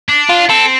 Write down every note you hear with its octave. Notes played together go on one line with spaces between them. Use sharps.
D4
F4
C4 A4